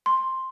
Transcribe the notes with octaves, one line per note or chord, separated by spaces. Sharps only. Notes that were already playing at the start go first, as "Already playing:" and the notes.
C6